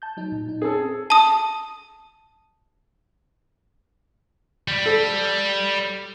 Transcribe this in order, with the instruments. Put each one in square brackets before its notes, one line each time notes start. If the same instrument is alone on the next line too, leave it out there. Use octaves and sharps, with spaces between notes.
[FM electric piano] A5 G6
F#3 D#4
A#2
D#4
[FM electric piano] C4 C#4 A5 [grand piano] G#4 A4
[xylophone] A5 D#6
[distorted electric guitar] G3
[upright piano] A4